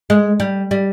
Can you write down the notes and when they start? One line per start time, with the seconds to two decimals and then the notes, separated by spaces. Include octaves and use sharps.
0.10 G#3
0.40 G3
0.71 G3